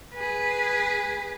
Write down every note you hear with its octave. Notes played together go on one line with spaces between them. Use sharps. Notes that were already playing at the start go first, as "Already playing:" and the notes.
G#4 B4